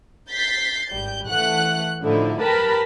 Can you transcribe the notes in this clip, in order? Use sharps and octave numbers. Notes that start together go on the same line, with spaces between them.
G6 A6 B6 C7
G#1 G3 G6
E3 A3 F#5 F#6
A2 D3 F3 D#4 E4
G4 A#4 B4 A5 B5